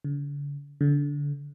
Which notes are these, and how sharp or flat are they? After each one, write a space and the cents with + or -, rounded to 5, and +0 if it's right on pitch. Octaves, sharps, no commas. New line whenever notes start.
D3 -45
D3 -25